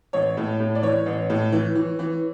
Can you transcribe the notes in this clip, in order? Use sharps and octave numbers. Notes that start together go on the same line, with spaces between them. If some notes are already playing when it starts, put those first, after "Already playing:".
A1 C#5
A2
A2
D5
E3 C#5
A1
A2
E3
E3
E3